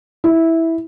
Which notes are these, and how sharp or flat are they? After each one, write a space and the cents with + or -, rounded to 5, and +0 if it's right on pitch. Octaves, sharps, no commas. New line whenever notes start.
E4 -10